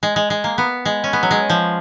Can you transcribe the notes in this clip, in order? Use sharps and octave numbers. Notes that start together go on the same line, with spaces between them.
G#3
G#3
G#3
A#3
B3
G#3
C#4
B3
F#3
G#3
F3